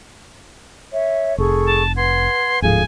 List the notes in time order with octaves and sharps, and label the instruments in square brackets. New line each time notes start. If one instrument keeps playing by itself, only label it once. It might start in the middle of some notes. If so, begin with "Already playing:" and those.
[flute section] C#5 E5
[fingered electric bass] F1 [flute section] G#4 A4 C#6
[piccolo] A5
[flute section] B4 F#5 G#6 [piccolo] C6
[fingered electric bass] D1 G#2 F3 [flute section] G#4 A4 F5 [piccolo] G#5